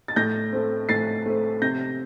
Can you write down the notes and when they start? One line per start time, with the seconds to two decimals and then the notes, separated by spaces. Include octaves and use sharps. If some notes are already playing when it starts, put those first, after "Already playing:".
0.08 A6
0.16 A2 G6 A#6
0.53 A3 C4
0.89 A2 A6 C7
1.26 A3 C4
1.62 C3 G6 A#6